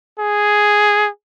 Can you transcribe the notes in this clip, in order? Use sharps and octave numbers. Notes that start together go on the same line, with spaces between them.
G#4